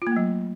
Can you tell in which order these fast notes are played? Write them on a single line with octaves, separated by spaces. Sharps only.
F4 A#3 A3 F#3